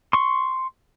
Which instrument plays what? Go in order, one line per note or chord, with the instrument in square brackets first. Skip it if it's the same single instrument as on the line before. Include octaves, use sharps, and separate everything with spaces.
[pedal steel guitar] C6 C#6